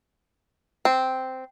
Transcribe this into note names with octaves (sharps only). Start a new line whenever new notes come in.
C4